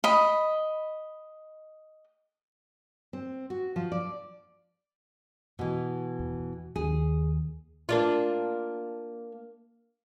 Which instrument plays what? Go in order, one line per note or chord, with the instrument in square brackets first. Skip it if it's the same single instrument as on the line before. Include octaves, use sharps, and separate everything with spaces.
[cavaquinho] D#5 B5
[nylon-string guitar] C4
F#4
F3
D5
B2 E3
[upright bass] E2
[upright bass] D#2 [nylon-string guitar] G#4
[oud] A#3 D4 F4